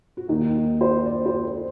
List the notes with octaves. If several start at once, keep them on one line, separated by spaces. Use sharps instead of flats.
F#4
D#2 D#3 D#4
C5
D5
C5
A4